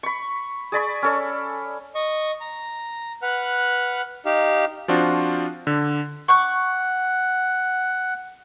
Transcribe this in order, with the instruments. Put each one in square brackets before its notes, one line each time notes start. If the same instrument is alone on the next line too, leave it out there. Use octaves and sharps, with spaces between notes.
[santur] B5 C#6
G#4 D5 B5 C#6
C#4 A4 D5
[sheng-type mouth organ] D#5 C#6
A#5
B4 F#5 F6
D#4 G4 F5
[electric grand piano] F3 C4 D4 F4 F#4
D3
[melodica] F#5 [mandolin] C#6 D6 F#6